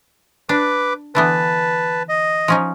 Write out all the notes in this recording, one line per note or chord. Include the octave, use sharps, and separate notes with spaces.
D4 B4 D6
D3 E3 B3 B4 A5
D#5
F3 C#4 D#4